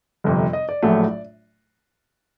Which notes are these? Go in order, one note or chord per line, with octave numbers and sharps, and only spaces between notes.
G1 F2 C3
D#5
D5
A#1 A2 F#3 A3